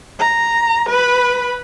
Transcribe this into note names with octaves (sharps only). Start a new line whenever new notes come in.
A#5
B4 B5